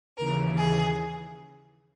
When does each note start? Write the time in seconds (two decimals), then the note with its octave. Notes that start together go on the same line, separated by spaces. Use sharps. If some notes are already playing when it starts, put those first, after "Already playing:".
0.17 D#2 C#3 E3 A#4
0.57 G#4